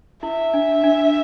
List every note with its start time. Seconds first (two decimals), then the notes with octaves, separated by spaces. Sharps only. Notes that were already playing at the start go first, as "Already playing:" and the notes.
0.23 E4 E5
0.54 D4
0.84 D4